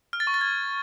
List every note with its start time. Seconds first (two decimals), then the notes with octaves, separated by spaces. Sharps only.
0.13 F6
0.20 A6
0.27 C#6
0.34 A6
0.41 G#6